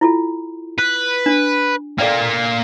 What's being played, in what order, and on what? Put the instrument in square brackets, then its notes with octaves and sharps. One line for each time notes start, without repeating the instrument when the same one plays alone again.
[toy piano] E4 F4 A4
[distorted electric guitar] B4
[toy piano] D4
[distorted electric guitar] A#3 F4 [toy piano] A4 D5 G5